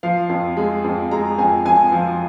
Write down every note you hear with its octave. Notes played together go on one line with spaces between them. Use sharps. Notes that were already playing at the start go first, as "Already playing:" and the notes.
F3 F5
F2
G#3
F2
G#3 A#5
F2 G#5
F2 G#5
F3